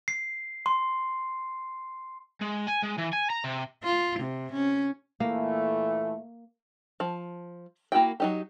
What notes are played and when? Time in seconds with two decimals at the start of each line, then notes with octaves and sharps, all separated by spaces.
0.08 C7
0.66 C6
2.41 G#3
2.68 G#5
2.83 G#3
2.98 E3
3.13 G#5
3.30 A#5
3.44 C3
3.83 F4
4.19 C3
4.53 C#4
5.20 A#2 E3 A3 A#3
7.00 F3
7.92 A#3 E4 F#4 G5
8.20 F#3 D#4 G4